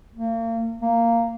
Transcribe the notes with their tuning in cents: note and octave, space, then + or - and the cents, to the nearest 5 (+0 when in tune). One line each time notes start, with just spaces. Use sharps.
A#3 -35
A#3 -10